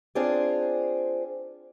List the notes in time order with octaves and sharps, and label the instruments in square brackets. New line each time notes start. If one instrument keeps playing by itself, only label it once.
[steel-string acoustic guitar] C4 D4 F4 G#4 C5 D5